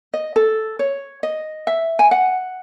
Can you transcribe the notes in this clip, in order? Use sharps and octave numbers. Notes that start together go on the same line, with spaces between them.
D#5
A4
C#5
D#5
E5
G#5
F#5